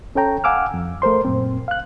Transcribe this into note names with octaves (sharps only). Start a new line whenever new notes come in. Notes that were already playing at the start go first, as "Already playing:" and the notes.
C#4 A4 C#5 G5 A#5
F5 F#5 G#5 D6 E6 F6
F2
A3 A#4 C5 C6
F#2 A#2 C4
F5 F#6